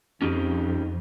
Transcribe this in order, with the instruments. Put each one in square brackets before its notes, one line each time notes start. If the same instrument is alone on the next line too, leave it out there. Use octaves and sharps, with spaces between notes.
[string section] F2 [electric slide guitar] C#4 D#4 G4